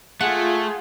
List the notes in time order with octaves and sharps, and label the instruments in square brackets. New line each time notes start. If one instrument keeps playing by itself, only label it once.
[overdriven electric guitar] A3 [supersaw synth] F4 [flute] G#4 [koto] F#5